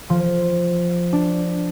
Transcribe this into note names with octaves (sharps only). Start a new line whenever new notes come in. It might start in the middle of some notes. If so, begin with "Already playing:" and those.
F3
D4